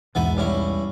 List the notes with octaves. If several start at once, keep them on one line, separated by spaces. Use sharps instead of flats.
B1 E2 G#2 B3 E5 G#5
G2 C#4 E4